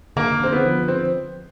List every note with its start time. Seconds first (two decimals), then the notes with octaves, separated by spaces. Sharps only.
0.16 D3 A#3
0.40 D3 C4
0.53 B3
0.65 F3
0.88 C4